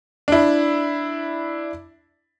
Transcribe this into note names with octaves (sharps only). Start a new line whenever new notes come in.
D4 E4